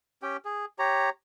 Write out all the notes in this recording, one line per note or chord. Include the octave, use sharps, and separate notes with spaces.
C#4 G4 G5
G#4
G4 C#5 A#5